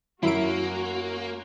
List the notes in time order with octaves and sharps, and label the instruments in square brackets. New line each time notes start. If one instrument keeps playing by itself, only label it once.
[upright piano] F#2 [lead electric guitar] A#3 [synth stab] E4 D7 [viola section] F#4